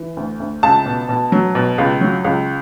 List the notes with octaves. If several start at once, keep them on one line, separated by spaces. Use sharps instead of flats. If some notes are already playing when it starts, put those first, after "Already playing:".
Already playing: E3
D2
D2
C#2 A5
B2
B2
F#3
B2
C#2
F#3
C#2